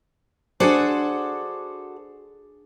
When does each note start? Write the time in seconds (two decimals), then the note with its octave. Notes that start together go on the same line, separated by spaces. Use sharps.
0.60 D4 F#4 G#4 A4 C5 D5